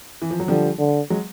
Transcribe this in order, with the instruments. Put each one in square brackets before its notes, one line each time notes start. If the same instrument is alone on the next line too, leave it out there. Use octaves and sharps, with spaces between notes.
[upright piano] E3
F3
F#3
[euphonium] D3 [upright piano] F3 G3
[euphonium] D3
[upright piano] F#3 G#3